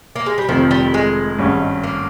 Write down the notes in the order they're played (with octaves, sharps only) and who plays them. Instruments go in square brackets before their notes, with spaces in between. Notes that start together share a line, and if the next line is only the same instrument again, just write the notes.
[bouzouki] A#3
G#3
G3
[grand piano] F1 F2 D#3 [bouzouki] F3
[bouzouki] G3
G#3
[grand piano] G#1 G2 G3 C#4
[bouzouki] A#3